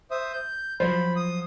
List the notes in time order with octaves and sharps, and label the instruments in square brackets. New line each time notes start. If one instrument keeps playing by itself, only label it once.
[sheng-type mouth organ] C5 E5 D#6
G6
[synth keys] F3 F#3 [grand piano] C5 [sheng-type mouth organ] B5
[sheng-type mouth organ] D#6